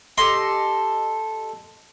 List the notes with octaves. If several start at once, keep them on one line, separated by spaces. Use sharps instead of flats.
G4 A4 D#5 C6